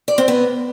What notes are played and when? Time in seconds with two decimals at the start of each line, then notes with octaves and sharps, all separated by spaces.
0.08 D5
0.18 C4
0.28 B3